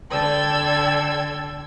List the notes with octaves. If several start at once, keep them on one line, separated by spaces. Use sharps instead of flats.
D3 A4 D5 G5 E6 G#6